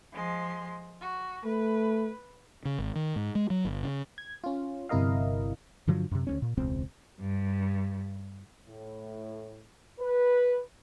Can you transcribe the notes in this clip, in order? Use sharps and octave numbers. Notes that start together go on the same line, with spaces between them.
F3 G#3 C6
F#4
A3 B4
C#3
G#1
D#3
G#2
G#3
F#3
G1
C#3
G#6
C#4 F4
G1 C3 E4 A#4 D#5 F5
G2 D3 F3 F#3
F#2 C3
D2 B3 C#4
A#2
E1 C#2 C4
G2
A2
B4